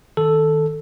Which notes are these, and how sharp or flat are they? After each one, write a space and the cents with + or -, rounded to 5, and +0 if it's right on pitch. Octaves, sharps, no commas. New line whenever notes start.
D#3 +0 A4 +0